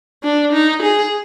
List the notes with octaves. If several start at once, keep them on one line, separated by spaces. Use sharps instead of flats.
D4
D#4
G#4